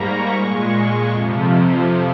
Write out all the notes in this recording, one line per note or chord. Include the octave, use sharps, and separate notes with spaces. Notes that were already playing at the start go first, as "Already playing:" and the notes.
Already playing: G#2 G3 A#3 A#5 C#6
A#2 G#3 C#6
F2 C3 F3